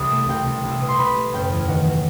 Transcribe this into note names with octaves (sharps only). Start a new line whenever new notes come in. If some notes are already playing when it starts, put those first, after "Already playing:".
Already playing: C2 D#6
A3
C2 G5
C2
C2
E6
B2 D#6
C6
B2 B5
A3
F#1 G5
E2
D#3 F#5
F#3